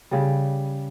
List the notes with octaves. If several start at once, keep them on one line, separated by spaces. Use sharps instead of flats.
C#3 G3